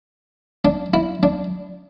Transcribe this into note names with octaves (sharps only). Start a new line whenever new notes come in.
D4
E4
D4